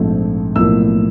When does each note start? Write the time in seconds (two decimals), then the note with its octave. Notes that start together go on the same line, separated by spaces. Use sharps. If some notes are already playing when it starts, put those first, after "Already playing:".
Already playing: A#1 G#2 F3 A3 C4
0.55 B1 A2 F3 A#3 E6